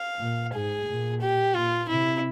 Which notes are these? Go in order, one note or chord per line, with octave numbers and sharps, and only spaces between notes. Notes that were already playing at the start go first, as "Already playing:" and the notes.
Already playing: F5
A#2
G#2 G#4
A#2
G4
A#2 F4
C3 E4